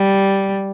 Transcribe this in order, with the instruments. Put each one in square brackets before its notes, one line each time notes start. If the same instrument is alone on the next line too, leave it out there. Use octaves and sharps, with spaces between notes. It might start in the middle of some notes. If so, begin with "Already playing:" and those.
Already playing: [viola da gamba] G3